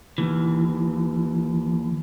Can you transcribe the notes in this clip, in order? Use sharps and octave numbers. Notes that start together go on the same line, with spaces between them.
D#2 E3